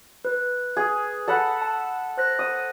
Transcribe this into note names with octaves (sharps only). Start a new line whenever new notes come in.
B4
G#4
A4 F#5 B5
A5
C5 F#6 A#6
D#6